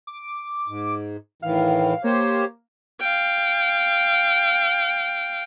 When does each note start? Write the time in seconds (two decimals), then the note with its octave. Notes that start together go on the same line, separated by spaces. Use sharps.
0.07 D6
0.68 G#2
1.42 A2 D#3 E3 F5
2.04 A#3 G4 C5 C#5
3.00 F5 G5